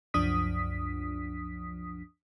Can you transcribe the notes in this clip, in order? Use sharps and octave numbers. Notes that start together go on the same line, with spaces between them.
C2 F#2 F3 D4 D#6 B6